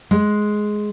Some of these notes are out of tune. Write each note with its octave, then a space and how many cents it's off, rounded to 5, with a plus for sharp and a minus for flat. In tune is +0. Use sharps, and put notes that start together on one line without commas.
G#3 +10